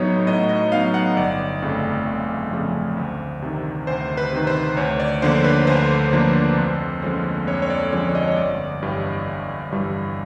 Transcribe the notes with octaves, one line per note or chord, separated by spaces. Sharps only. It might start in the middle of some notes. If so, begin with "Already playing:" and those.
Already playing: A2 F#3 B3 D#4 C#5
A2 D#5
D#5
F#3 B3 D#4 F5
F#5
G1 D5
F2 C#3 F3 A3
G1
F2 C#3 F3 A3
D2
C3 D#3
D2 C5
B4
C3 D#3
C5
D2 C#5
D5
D3 F3 A#3 D4 C5
B4
D2 C5
D3 F3 A#3 D4
F2
D3 F3 G#3 C#4
F2 C#5
C#5
D5
D3 F3 G#3 C#4 C#5
D5
D#5
C#5
G1 D5
G2 E3 G3
G1
G2 E3 G3